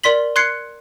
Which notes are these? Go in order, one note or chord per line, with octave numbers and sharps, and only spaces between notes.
A#4 D5 C6 B6 F#7
C6 F#6 G#6 C7 C#7